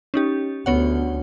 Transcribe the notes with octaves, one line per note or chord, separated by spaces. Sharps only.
C#4 D#4 G4
D2 B3 C#5 F#5